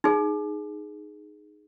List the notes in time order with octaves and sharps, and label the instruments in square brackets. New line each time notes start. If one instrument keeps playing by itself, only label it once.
[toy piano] D#4 G#4